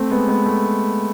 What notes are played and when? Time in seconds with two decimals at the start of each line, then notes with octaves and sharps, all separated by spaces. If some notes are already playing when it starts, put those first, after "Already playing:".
Already playing: A3 C4
0.11 G#3 B3
0.28 G#3 B3
0.46 A3